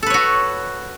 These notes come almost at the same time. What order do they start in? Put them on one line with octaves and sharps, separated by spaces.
A4 B4 C#5 F#4